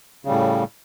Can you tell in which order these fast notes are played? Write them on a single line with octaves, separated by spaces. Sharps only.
C#3 G3 A2